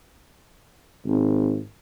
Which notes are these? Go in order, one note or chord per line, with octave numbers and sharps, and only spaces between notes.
G#1